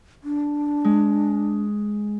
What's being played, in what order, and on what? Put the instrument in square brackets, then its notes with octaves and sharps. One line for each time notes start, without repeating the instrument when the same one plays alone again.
[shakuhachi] D4
[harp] G#3